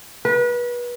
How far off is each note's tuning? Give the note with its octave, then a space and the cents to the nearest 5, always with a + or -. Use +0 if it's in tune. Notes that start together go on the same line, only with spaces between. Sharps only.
B4 -30